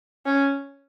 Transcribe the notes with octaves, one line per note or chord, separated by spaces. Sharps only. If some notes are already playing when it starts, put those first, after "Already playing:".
C#4